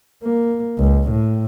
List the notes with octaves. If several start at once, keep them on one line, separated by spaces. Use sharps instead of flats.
A#3
C#2
A2